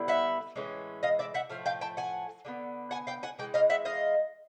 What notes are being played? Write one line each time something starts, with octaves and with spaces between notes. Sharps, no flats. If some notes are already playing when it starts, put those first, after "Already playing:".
Already playing: D3 G3 B3 E4
E5 F#5
A2 E3 G#3 C#4
D#5 F5
D5 E5
E5 F#5
A2 F3 A3 F5
F5 G5
G5 A5
F#5 G#5
D3 G3 B3
F#5 G#5
F5 G5
F#5 G#5
E3 G#3 G5
D#5 F5
E5 F#5
D#5 F5